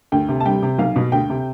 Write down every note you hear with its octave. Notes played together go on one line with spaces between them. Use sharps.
D2 G5
C3
A5
G3 G5
C3
B1 F5
B2
D2 G5
C3